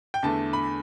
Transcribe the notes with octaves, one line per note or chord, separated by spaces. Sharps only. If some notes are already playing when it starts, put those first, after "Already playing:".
G5
E2 D3 A3 A5
B5